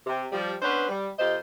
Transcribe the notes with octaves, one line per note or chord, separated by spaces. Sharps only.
C3
F3 G3
B3 C#4 D4 B4 C5
G3
F2 F4 G4 C5 D#5